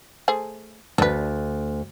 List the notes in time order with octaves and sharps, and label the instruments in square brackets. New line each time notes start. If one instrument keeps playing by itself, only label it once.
[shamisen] A3 G#4 C5
[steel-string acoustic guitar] D2 [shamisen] D4 B4